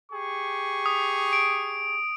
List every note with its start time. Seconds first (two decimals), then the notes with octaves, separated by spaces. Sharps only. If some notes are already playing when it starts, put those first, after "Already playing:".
0.12 G4 G#4 C#6
0.86 D#6
1.33 D7